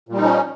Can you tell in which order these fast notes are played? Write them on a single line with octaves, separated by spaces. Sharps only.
A#2 G3 D#4 F3 C#4